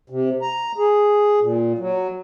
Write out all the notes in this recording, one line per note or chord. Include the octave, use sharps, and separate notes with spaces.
C3
A#5
G#4
A#2
F#3